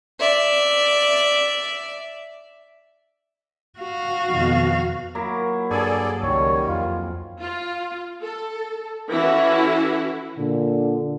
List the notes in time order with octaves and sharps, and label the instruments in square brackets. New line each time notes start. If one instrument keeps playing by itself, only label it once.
[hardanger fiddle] D5 E5
[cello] F#4 F5
[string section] F2 B2 D#3
[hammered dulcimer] F#3 A#3 E4
[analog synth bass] G2 [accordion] G#4 A4 D5 [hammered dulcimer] G#5
[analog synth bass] C#2 [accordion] D#3 G3 [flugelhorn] C#5
[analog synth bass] F2 [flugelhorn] F4
[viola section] F4
A4
E3 C#4 E4 F#4 A4
[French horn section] A#2 D3